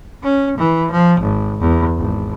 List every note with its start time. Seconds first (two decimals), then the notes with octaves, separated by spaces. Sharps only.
0.23 C#4
0.58 E3
0.91 F3
1.21 G#1
1.60 E2
1.97 G#1